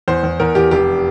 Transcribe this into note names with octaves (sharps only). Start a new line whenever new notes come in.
E2 C5
E2
E2 A#4
E2 G4
F1 G4